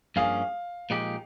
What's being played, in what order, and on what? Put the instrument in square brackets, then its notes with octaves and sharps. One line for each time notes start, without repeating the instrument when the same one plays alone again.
[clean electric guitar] G2 F3 A#3 C#4 G#4 [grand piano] F5
[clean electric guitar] A#2 F3 G#3 D#4 G4